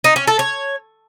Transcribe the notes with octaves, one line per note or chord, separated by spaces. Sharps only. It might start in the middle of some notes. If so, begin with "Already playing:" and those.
D#4
C#4
A4
C#5